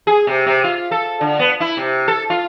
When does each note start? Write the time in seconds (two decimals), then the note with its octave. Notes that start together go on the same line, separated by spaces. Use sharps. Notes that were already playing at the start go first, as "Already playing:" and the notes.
0.07 G#4
0.27 C3
0.46 C3
0.64 F4
0.91 A4
1.21 D3
1.39 B3
1.60 E4
1.77 C3
2.08 A4
2.30 F4